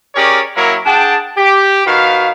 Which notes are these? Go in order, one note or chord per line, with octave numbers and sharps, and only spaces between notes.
C#4 G4 G#4 A#4 C#5 D5
F#3 A#3 E4 A#4 C#5
D4 G#4 F#5 G5 A5
G4
D#3 F#4 B4 F5